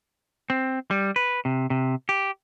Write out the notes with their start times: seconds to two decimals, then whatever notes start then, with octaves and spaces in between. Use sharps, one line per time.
0.50 C4
0.91 G3
1.16 B4
1.45 C3
1.70 C3
2.09 G4